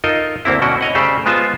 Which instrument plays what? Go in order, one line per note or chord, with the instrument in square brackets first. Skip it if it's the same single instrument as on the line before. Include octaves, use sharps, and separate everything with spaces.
[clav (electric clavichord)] D#4 F4 A4 A#4 D#5
D2 A#3 C4 E4
B2 C#4 F#4 G5
C#5 D#5 F#5
C#3 A3 G4 C5 D5
G#3 B3 F4 C5 G#5 A5